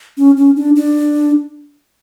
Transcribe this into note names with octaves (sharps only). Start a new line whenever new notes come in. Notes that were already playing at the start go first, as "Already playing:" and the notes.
C#4
C#4
D4
D4